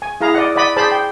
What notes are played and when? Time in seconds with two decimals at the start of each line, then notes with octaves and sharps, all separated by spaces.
0.02 G#5
0.21 E4 G#4 F5 A#5
0.34 D5 D#5 F#5
0.56 D5 D#5 F#5 B5
0.76 G#4 C5 D5 A5 B5
0.91 G5